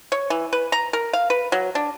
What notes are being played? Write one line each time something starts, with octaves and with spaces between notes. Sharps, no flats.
C#5
E3
B4
A#5
A#4
F5
B4
F#3
D4